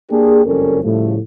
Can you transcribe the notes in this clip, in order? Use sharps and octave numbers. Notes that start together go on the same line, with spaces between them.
A#3 D4 G4 G#4
F#1 F2 G3 C#4 A4 A#4
A2 C#3 F3 G3 A3